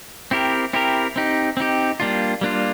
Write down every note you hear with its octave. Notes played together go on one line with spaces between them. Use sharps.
C4 E4 G4 A#4
C4 E4 G4 A#4
C4 D#4 G4
C4 D#4 G4
G3 A#3 D4 F4
G3 A#3 D4 F4